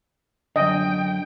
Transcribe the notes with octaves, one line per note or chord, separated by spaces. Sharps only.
F#2 D3 D#5 G5